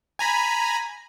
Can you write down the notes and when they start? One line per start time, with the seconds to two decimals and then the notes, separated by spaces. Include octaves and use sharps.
0.19 G#5 A#5 B5